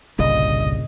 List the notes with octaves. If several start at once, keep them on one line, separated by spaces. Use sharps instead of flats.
G1 C2 G2 A#2 C#3 G3 D#5